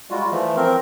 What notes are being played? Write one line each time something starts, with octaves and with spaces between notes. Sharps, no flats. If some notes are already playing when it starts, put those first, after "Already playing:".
G3 G#3 F4 F#4
E3 F3 A3
C4 A#4